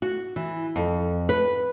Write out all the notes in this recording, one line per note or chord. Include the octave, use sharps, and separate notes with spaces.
F#4
E3
F2
B4